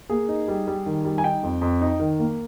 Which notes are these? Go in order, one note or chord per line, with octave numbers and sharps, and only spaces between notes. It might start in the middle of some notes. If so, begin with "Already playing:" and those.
A#3 G#4
D#4
G3
G3
D#3
G3
G#5
D#4 G5
F2
F2
D#4
D#3
A#3